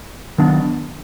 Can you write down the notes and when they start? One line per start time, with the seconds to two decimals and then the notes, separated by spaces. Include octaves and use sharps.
0.38 D#3 F#3 B3 D4